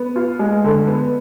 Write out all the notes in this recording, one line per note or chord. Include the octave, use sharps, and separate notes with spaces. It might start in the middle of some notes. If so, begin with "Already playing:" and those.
Already playing: B3
F4
G#3
D3
B3